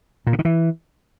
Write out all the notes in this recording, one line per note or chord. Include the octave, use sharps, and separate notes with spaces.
A#2
C#3
D#3
E3